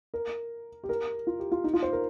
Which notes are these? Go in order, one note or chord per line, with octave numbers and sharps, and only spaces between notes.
A#4
G4
A#4
F4
G4
F4
D#4
F4
C5
A#4